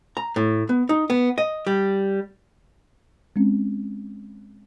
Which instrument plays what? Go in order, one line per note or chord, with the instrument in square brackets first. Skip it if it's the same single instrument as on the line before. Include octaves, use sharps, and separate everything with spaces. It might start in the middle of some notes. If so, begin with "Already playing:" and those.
[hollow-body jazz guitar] A#5
A2
B3
D#4
B3
D#5
G3
[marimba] G#3 C4 C#4